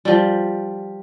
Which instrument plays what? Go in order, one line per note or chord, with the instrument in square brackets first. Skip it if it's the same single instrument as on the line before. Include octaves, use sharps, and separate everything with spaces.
[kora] F3 G3